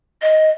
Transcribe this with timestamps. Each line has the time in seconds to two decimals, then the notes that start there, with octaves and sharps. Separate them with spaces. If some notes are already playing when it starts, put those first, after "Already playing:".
0.22 D#5